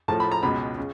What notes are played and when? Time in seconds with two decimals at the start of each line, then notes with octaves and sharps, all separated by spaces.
0.08 A2 F3 A3 A5
0.20 B5
0.32 A#5
0.43 C#2 B2 G#3 B5
0.78 C#3